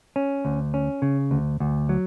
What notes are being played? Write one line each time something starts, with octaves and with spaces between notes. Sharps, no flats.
C#4
D2
C#4
C#3
D2
D2
F#3